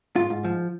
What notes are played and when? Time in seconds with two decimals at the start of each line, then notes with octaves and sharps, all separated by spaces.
0.16 G#2 F4
0.30 G#2
0.44 F3